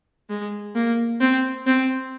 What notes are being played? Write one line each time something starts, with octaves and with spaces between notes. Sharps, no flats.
G#3
A#3
C4
C4